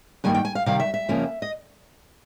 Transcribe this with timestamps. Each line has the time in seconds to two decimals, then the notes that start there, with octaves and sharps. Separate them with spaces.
0.24 G2 D#3 G3 A#3 G#5
0.35 G5
0.45 G#5
0.55 F5
0.66 C3 D#3 G3 F5
0.80 E5
0.94 E5
1.09 F2 C#3 F3 A#3 C#4
1.42 D#5